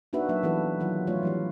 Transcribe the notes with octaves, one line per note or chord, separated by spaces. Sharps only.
A#3 D4 D#4 F#4 B4 E5
F#3 A#3 E5
E3 G3 B3 E4 A4 B4
D#3 F#3 F4
A3 F4 C#5 D5
E3 G3 E4